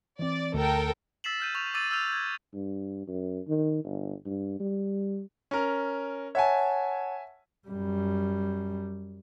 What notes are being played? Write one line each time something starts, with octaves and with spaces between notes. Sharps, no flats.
E3 C4 D5
D2 A4 A#4 G5
E6 A6 B6 C7 E7 F#7
F6 G6 D#7
C#6 G6 F7
D6 E6 A6 D#7
E6 F6 G6 F7 F#7
G6 G#6
G2
F#2
D#3
G1
G2
G3
C#4 A#4
C#5 E5 F#5 G#5 A5
F#2 G3